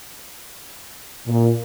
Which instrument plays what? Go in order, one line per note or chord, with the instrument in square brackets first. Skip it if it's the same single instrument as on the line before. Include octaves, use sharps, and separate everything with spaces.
[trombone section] A#2